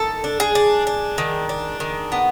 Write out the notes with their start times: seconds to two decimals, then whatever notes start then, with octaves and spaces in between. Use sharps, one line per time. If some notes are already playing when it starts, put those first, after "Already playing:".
Already playing: D#3 A4
0.24 D4
0.40 G#4
0.55 D4
0.87 D4
1.18 D#3
1.49 D4
1.80 D#3
2.12 B3